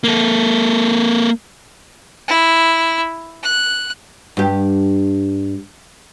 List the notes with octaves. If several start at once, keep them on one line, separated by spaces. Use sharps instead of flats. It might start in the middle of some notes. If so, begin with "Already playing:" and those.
A#3 A4
E4
F#6
G2 G4